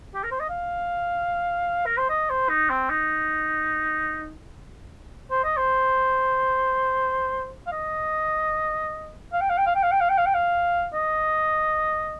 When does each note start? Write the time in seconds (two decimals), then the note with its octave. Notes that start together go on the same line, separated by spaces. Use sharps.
0.15 G4
0.23 A#4
0.31 C5
0.40 D#5
0.49 F5
1.86 A#4
1.98 C5
2.09 D#5
2.30 C5
2.49 D#4
2.70 C4
2.90 D#4
5.31 C5
5.44 D#5
5.57 C5
7.67 F5
7.72 D#5
9.32 F5
9.41 G5
9.49 F5
9.58 G5
9.66 F5
9.75 G5
9.83 F5
9.92 G5
10.00 F5
10.09 G5
10.18 F5
10.26 G5
10.34 F5
10.94 D#5